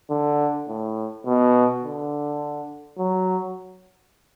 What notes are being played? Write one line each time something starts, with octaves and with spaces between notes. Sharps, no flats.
D3
A2
B2
D3
F#3